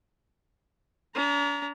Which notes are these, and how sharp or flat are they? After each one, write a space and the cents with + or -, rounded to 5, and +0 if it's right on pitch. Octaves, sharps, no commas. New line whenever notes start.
D4 -45 A#5 +0